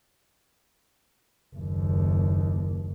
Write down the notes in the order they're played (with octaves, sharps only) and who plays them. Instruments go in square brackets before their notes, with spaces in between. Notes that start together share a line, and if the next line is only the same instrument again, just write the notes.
[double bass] F#1 D#2